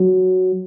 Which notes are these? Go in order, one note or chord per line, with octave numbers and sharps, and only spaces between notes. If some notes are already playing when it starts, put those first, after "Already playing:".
Already playing: F#3